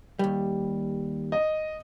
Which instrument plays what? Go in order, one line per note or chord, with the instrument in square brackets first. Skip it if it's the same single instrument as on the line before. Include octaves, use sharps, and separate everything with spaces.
[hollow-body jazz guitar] D#2 G3
[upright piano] D#5